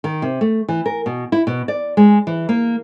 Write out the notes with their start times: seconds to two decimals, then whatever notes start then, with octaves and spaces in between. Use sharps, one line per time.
0.04 D#3
0.22 C3
0.41 A3
0.68 E3
0.86 A#4
1.06 B2
1.32 E4
1.47 B2
1.68 D5
1.97 G#3
2.27 E3
2.49 A#3